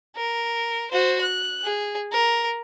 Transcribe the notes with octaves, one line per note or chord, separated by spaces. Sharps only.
A#4
F#4 C5
F#6
G#4
A#4